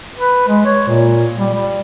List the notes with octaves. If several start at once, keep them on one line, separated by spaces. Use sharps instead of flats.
B4
G#3
C#5
A#2
G3
G3